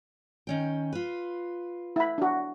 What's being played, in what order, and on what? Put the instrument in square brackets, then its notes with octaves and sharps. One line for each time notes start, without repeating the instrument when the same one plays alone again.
[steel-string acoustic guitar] D#3 C#4 G5
F4 B4
[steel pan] E4 B5
D4 F#4